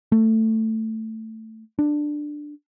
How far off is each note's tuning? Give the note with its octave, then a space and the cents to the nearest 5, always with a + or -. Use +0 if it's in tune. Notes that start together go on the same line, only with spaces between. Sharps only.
A3 +10
D4 +10